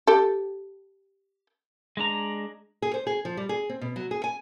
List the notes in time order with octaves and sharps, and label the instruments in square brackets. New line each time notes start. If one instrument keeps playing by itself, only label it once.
[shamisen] G4 A4
[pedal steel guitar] G#3 D4 A#5
[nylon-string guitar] G#4
C5
G#4
F3
G3
G#4
C4
B2
F#3
G#4
G#5